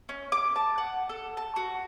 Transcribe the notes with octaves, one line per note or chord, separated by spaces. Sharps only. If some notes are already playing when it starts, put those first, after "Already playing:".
C#4
D6
A5
F#5
A4
A5
F#4